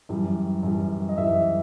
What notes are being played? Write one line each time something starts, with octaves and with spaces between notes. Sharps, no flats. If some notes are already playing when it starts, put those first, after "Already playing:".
F#2 E3 G3
F#2 E3 G3
D#5
F#2 E3 G3 E5